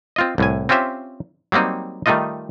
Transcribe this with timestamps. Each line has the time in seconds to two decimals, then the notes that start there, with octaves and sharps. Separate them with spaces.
0.16 C4 F4 D#5
0.38 C2 A2 G#5
0.69 C4 C#4 F4 G4 C5 E5
1.52 F#3 G3 A#3 C4 D#4
2.06 D#3 G3 A3 D#4 F4 D#5